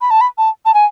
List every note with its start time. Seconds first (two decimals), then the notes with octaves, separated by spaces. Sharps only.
0.01 B5
0.10 A5
0.21 B5
0.38 A5
0.65 A5
0.74 G#5